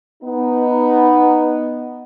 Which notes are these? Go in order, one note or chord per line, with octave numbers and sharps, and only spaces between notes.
B3 D#4